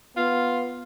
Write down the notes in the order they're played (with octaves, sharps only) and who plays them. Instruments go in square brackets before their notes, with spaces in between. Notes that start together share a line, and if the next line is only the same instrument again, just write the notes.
[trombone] B3 [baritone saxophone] F4